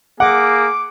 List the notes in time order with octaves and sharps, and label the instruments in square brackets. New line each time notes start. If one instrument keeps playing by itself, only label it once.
[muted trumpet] A#3 [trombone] G#4 [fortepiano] F#5 [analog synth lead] D6